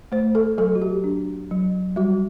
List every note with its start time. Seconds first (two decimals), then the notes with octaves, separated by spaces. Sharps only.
0.12 A3 C5
0.35 A4
0.58 F#3 A4
0.75 F#4
0.82 G4
1.04 D4
1.51 F#3
1.96 G3 F#4